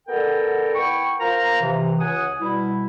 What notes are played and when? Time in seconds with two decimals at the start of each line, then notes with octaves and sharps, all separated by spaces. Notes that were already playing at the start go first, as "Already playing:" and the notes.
0.08 B3 A4 A#4 D5 F#5 G5
0.75 B3 E4 G5 C#6
1.20 F4 A#4 C5 A#5
1.61 C3 E3
1.99 C#2 F#5 G#5 D#6
2.40 B2 G3 E4